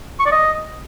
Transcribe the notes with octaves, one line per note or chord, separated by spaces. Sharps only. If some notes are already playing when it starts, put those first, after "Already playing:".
C#6
D5
D#5